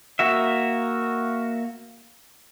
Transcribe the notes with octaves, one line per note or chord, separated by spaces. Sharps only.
A#3 F#4 E5